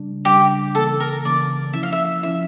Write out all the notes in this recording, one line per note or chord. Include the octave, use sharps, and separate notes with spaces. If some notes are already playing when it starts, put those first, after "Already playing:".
Already playing: C#3 G3 D4
C#3 G3 D4 G4
C#3 E3 A#3 A4
A#4
C#3 E3 A#3 D5
F3 C#4 E4 E5
F5
E5
F3 C#4 E4 E5